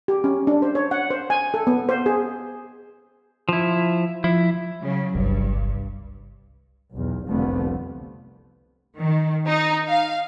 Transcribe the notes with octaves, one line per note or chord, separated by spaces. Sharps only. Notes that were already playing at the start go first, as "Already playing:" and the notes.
G4
C#4
D4
C5
C#5
F#5
C5
G#5
A4
B3
C5
G#4
F3 E4
F3 E4
C#3 F#3
G1 C2 G2
B1 E2
F1 C2 D3 F3 A3 B3
D#3
D#4
F5